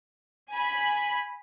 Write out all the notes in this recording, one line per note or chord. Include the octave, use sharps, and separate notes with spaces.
G#5 B5